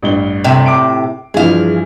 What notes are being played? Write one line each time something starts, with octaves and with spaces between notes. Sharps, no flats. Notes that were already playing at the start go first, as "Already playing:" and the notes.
A1 G2 G7
A2 C3
D6 D7
G2 E3 F3 G#4 F5